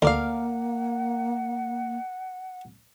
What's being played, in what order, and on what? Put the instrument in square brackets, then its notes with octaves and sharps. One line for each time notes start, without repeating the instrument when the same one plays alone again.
[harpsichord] D2 [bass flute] A#3 [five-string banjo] A#4 D5 F5 [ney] F#5